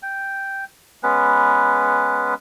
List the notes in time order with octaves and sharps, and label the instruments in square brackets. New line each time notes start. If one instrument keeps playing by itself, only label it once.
[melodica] G5
G#3 B3 C#4 B4